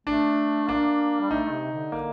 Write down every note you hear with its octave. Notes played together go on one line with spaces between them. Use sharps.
A3 D4
A#3 D4
G3
A3 D#4
C3
D3
A#3